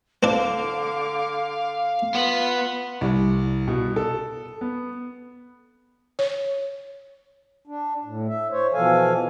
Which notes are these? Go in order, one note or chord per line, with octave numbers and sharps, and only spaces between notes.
D3 C4 D4 F5 D6
B3 F4
C2
B2
A4
B3
C#5
D4
A2
E5
C5 C#5
B2 E3 F3 A4 F5 G#5